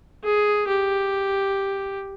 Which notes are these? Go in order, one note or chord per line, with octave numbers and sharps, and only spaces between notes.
G#4
G4